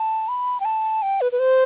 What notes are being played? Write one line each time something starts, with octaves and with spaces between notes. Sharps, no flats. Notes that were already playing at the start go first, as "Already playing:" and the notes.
Already playing: A5
B5
G5
A5
G5
B4
B4
C5